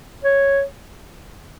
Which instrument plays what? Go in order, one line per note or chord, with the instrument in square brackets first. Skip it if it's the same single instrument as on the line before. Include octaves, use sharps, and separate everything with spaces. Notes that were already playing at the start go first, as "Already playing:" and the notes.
[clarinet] C#5